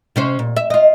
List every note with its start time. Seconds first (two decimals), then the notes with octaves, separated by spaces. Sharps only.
0.16 C3 C#4 C5
0.39 A#2
0.56 E5
0.70 F4 D#5